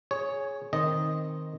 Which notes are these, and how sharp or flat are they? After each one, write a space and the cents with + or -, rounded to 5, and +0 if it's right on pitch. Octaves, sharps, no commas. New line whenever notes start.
G#4 +0 C#5 +0
D#3 +0 C4 +0 D#5 -5